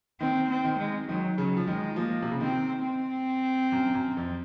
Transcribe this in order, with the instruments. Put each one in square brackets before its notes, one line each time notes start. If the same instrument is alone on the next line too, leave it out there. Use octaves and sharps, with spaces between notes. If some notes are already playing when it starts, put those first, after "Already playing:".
[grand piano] D#3 [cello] C4
[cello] C4
[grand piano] D#3
[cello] G#3
[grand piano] D#3 [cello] F#3
[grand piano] C#3 [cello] F#3
[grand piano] F3
[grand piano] D#3 [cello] G#3
[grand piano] F3 [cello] A#3
[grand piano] C3
C#3
[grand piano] D#3 [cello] C4
[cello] C4
[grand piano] F#2
F#2
F2